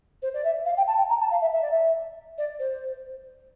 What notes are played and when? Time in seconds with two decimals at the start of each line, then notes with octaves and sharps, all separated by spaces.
0.22 C5
0.33 D5
0.44 E5
0.65 F5
0.77 G5
0.87 A5
0.98 G5
1.09 A#5
1.20 A5
1.31 F5
1.41 E5
1.52 E5
1.61 D5
1.71 E5
2.38 D5
2.59 C5